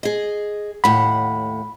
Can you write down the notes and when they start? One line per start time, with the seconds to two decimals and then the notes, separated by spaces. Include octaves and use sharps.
0.03 G#4 D#5
0.84 D#2 A2 F#5 B5